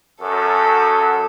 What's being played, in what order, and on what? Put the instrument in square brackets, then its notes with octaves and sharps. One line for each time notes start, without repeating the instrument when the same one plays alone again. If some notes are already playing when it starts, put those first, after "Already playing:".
[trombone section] F#2 [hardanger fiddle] A4